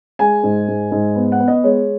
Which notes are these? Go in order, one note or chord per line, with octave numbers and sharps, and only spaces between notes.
G#3 G#5
G#2
G#2
G#2
B3
F#5
B3
D#5
G#3 C#5